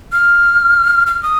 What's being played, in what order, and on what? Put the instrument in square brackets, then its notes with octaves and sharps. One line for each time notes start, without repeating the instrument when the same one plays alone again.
[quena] F6
F6
D#6